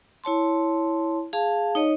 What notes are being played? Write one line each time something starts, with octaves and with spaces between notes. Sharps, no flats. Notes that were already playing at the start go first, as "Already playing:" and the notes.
E4 C#5 A5 C6
G#4 F5 A5
D#4 C#5 D#5